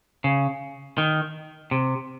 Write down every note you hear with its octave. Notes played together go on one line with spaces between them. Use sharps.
C#3
D#3
C3